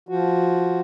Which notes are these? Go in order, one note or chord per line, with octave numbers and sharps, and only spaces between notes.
F3 F#4